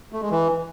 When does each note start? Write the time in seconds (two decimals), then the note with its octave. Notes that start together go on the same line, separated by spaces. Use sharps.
0.12 A3
0.21 G#3
0.30 E3